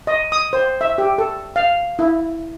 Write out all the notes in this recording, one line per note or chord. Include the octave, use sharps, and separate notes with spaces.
D#5
D#6
C5
E5
G4
A4
F5
E4